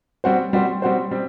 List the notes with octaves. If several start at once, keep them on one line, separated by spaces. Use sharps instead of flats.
G3 C4 F#4 C5
G3 C4 F#4 C5
G3 C4 F#4 C5
G3 C4